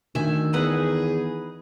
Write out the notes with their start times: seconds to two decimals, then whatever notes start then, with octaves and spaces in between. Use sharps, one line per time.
0.15 D2 D#3 E5 G#5
0.53 E2 D#4 G#4 B4 F#5